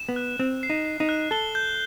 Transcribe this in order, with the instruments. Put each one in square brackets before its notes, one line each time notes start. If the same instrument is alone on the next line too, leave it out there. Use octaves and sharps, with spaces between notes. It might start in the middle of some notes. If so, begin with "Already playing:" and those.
Already playing: [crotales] E7
[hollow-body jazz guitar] B3
[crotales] F#6
[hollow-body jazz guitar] C4 [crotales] F#6
[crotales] C7
[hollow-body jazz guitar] D#4
[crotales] C7
[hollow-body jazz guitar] D#4
[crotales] F#6
[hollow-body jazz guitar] A4 [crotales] G7
[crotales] G6